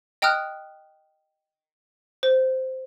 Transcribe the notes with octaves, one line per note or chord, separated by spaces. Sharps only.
D#5 G5 A#5 D#6 F6 F#6
C5